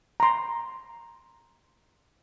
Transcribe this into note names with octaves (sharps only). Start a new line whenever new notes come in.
A#5 C6